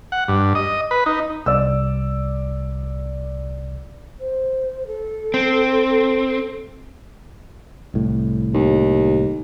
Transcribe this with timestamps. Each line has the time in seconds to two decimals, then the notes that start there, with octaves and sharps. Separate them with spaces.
0.12 F#5
0.28 G2
0.55 D#5
0.91 B4
1.06 D#4
1.46 C2 D5 E6
4.20 C5
4.87 A4
5.34 C4
7.94 C2 A2
8.54 D#2